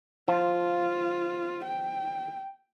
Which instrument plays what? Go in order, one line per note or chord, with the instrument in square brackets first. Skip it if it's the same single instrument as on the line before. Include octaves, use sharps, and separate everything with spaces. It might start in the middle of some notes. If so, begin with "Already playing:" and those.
[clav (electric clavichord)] F3 [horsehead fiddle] F4
[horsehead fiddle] G5